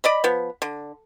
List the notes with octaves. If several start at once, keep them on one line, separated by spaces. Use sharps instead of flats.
D5 D#5 B5
F3 B3
D3